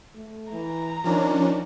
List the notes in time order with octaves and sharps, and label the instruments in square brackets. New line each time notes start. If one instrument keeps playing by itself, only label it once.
[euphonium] A3
[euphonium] E3 [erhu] A#5
[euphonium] D#3 [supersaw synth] F3 C#4 D4